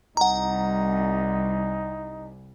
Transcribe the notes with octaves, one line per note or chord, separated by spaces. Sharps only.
C2 D#4 F#5 A#5